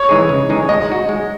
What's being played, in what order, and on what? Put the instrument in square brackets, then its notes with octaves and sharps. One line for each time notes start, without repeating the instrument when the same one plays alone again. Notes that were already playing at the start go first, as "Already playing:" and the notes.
Already playing: [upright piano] C#5
[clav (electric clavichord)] E3 G#3 D#4 G#4
C#3
E3 G#3 D#4 G#4
[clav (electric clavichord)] G#3 [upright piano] D#5
[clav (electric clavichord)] D#4 F#4
G#3